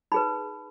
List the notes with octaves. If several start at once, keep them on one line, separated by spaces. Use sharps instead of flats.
D#4 G#4 B4 B5